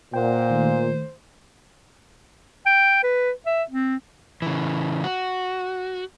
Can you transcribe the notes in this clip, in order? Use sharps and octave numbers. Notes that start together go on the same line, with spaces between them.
A#2 C5 F#5 G5
D#3 A3
G5
B4
E5
C4
C#3 E3
F#4